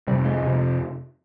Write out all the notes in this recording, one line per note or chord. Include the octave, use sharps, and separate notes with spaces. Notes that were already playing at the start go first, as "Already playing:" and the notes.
F2 C3 G3
G#3
F2 C3